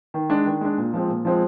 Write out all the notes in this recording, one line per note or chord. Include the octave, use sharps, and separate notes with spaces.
D#3
G#3 D4
D#3
G#3 D4
A#2
F3 G#3 C4
A#2
F3 G#3 C4